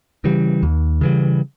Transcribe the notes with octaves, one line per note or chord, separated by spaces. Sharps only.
C#3 E3 G3
D#2
C#3 E3 G3